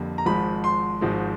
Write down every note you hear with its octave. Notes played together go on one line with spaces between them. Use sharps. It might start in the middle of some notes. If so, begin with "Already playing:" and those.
Already playing: F2 D3 G3 A#3
A#5
G#1 G#2 F3 G#3 B5
C6
G#1 G#2 F3 G#3